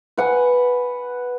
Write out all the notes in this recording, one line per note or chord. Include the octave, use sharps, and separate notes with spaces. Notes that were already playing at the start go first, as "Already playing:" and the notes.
B4 F#5 G#5